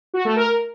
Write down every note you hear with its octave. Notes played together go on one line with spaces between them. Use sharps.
F#4
A3
A#4